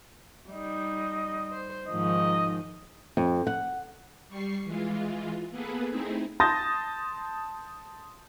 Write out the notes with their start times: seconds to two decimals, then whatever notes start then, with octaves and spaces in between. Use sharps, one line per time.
0.50 G3 D#4 D#5
1.51 C5
1.88 G#2 D#3 F3 D#5
3.17 F2
3.47 F#5
4.28 G3 C#6 C7
4.65 E3 G#3 F4
5.51 A#3 B3 G#4 A4 B4
5.90 A3 C4 D#4 E4 G#4
6.40 A5 C6 D#6 G6 A6 A#6